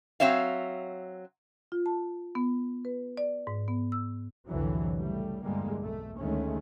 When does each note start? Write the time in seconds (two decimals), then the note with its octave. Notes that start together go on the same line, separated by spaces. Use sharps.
0.20 F#3 C4 C#5 E5 F5
1.72 F4
1.86 A5
2.35 B3
2.85 B4
3.17 D5
3.47 G#2
3.68 B3
3.92 E6
4.48 C2 F2 A2 D3 E3 F#3
4.97 C#3 G3 A3
5.43 E2 G2 D3 G3 G#3 A#3
5.82 B1 A3
6.19 D2 D#3 G#3 A3 C#4